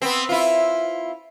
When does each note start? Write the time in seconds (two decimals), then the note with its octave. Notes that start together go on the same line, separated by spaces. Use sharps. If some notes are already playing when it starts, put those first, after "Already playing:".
0.02 B3 C4
0.29 E4 F4